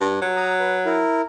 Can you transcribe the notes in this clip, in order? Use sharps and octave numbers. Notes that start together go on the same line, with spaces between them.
G2
F#3
A#5 D#6
B4
E4 A#4